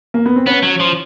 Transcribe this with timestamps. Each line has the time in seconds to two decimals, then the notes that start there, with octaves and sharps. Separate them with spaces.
0.14 A#3
0.26 B3
0.36 C4
0.46 B3 C#4
0.63 F#3
0.80 F3